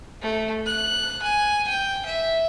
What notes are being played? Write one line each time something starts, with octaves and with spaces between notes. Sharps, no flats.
A3
F#6
G#5
G5
E5